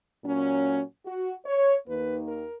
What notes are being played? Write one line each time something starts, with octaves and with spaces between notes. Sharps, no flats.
A#2 F#3 C#4
F#4
C#5
D#2 D#3 A#3 D#4 B4
A#4